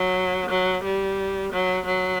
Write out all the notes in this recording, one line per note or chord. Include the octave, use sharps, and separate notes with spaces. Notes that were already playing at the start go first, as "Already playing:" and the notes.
Already playing: F#3
F#3
G3
F#3
F#3